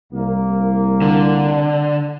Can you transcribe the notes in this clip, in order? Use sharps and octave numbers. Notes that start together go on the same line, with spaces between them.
C2 A#3
D3